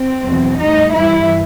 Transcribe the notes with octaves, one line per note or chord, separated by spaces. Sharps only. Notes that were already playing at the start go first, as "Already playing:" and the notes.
Already playing: C4
E2 B2 F#3
A2 G3 D#4
G2 E3 G3 E4